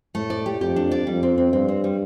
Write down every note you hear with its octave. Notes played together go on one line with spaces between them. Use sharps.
A2 A3
D5
G4
F2 G4
D4
D5
F2 G3
C4
C4
G2 C4
C4
G3